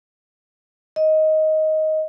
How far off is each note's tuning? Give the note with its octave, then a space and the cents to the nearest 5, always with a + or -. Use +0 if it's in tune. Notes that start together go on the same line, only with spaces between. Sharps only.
D#5 +10